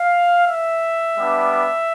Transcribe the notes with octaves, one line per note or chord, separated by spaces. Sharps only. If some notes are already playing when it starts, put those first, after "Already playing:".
Already playing: F5
E5
G3 B3 D4